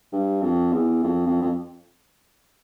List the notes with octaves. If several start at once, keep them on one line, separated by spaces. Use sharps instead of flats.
G2
F2
E2
F2
F2
F2